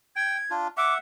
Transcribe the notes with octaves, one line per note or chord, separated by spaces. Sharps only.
G5 G#6
D4 F4
E5 F#5 D6